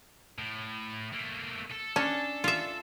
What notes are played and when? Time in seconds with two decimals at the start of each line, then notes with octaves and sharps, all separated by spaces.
0.39 A2
1.13 A3 A#3
1.72 A4
1.96 C#4 D4
2.44 F4 E5